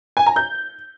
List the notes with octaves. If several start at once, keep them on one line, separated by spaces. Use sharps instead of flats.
G#5
A#5
G6